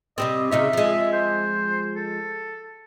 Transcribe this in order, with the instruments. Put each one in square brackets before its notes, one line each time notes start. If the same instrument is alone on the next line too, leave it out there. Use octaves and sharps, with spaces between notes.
[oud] C3 G3 C4 [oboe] D#5
[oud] C#3 D#4 F4 [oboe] E5
[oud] F3 G#3
[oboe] C5
A4